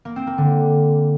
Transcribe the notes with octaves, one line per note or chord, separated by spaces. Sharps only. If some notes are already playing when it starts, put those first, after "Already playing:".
A#3
C4
A#3
D3